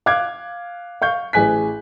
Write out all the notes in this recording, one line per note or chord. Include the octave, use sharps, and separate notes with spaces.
F5 D6 F#6 G#6
F5 C#6 G6
A1 G#4 G#5 F#6 B6